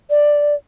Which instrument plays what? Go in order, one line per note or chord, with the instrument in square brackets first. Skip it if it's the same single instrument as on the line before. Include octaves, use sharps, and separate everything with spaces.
[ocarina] D5